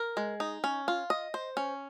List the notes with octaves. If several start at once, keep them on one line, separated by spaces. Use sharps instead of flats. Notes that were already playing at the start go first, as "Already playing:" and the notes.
Already playing: A#4
G#3
D#4
C#4
F4
D#5
C5
C#4